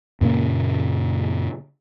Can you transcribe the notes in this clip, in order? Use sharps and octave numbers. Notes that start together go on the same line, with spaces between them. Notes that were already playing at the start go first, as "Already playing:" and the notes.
F#2 A#2 C#3 A#3